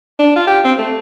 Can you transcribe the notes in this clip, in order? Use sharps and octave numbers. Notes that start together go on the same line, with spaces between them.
D4
F4
G4
C4
A3